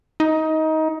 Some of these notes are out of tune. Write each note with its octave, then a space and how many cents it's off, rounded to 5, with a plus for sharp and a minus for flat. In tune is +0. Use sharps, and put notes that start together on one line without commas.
D#4 +20